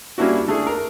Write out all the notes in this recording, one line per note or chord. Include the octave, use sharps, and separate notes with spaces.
G3 A#3 C#4 D4 E4 F#4
D3 A3 D4 G#4
A#4